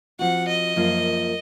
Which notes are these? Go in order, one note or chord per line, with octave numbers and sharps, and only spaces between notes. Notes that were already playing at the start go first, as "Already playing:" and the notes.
F3 C4 F#4 F#5
D#5
F#2 F3 A#3 F4